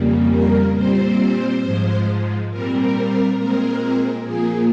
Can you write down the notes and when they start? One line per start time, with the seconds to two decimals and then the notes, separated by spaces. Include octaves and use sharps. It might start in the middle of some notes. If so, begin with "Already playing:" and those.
Already playing: F2 C#3 G3 A#3
0.32 A#4
0.75 A#2 G3 C4 C5
1.63 G#2 F3 G#3
2.50 A#2 G3 C4 A#4
2.79 A#4
3.08 A#4
3.37 A#2 G#3 C4 A#4
4.24 A#2 F3 A#3 G#4